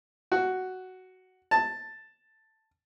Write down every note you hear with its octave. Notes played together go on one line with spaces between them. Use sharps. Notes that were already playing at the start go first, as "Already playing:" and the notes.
F#4
A5